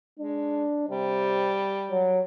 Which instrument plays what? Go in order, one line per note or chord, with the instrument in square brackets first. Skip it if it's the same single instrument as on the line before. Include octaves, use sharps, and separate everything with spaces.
[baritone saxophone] G#3 [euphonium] D4
[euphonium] C3 [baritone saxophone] G3
[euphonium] F#3